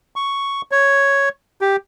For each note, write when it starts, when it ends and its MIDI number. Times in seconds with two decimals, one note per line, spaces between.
0.16 0.62 85
0.72 1.29 73
1.61 1.76 67